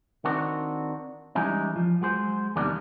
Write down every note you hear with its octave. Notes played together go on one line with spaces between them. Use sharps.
D#3 C4 D4 F#4
E3 G3 G#3 C#4 D#4
F3
F#3 G#3 C5
E2 C3 D#3 G3 A#3 D4